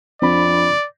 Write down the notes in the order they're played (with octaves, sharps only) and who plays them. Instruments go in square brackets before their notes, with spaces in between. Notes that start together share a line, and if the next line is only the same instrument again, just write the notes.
[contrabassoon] F2 [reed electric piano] C4 D4 B5 [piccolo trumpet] D5